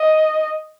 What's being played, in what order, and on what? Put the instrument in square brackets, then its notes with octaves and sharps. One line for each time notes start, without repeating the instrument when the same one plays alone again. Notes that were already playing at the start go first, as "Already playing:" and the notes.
Already playing: [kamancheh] D#5